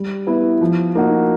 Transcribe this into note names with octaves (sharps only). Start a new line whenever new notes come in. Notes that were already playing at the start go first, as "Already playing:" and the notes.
Already playing: G3
B3 E4
F3
A#3 D#4 F#4